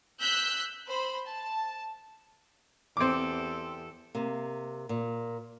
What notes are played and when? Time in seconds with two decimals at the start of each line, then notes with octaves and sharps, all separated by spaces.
0.20 E6 F#6 G6 B6
0.86 C5 B5
1.26 A5
2.97 E2 C4 G4 A4 D6
4.15 C3 A#3
4.89 A#2